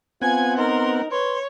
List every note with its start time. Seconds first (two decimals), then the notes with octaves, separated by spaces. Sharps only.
0.22 B3 C4 F4 F#5 G#5 G#6
0.57 D#4 A#4 C6
1.11 B4 C#5 C6